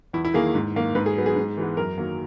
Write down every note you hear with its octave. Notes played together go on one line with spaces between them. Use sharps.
E2 E4
E4
D#3 A#3 G#4
G#2
D#3 A#3
G#2 B4
G#4
F#3 B3
G#4
G#2
E3 G#3 B3
F#2 A#4
D#3 F#3 A#3